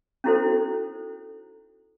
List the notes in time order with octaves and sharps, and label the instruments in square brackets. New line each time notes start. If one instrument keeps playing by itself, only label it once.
[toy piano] C#4 D#4 E4 F#4 A4 C5